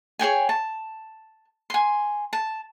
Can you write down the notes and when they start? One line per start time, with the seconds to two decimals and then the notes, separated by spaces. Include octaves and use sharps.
0.19 G#4 C#5 G5 G#5
0.49 A5
1.70 G#5 C6
2.33 A5